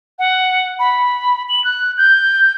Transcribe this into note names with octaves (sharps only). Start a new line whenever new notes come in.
F#5
B5
F#7
F#6
G6